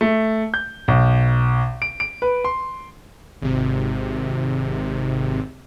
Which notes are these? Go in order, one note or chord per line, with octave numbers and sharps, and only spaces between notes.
A3
G6
B1
D7
D7
B4
C6
G#1 C3